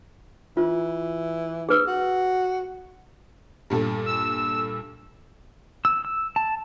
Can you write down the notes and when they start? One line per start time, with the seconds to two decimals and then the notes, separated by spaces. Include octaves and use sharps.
0.57 E3 F4
1.69 G#4 B4 E6
1.87 F#4
3.70 G2 A#2 A4
4.06 E6
5.85 E6
6.05 E6
6.36 A5